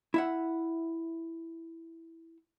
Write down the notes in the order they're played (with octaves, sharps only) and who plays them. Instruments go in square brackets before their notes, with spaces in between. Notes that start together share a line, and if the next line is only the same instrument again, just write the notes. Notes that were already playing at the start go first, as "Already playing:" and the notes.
[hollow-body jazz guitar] E4 E5 F#5